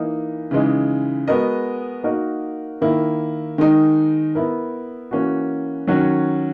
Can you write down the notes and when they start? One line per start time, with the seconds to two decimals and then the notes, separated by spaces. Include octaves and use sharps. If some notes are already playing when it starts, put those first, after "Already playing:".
Already playing: E3 A#3 D#4
0.51 C#3 E3 G#3 D#4
1.28 G#3 B3 F#4 A#4 D#5
2.04 A#3 D#4 F#4 A#4 D#5
2.81 D#3 A#3 E4
3.58 D#3 G#3 D#4
4.35 B3 E4 A#4
5.11 E3 A#3 C#4 F#4
5.87 D#3 F#3 C#4 F#4